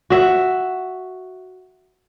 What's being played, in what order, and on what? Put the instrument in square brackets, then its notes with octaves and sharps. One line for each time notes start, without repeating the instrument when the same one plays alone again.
[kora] F#4 E5